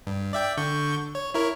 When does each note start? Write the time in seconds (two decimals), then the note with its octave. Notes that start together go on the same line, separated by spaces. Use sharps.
0.07 G2
0.33 D5 E5 G5
0.58 D3 C#6 G6
1.15 C#5
1.34 E4 A#4 C#5